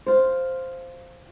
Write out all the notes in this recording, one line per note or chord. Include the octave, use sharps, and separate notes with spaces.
F4 C5